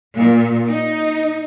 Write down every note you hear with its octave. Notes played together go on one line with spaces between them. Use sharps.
A#2
D#4